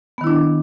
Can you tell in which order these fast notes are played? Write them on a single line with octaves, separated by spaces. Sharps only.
B3 D#3 E4 D4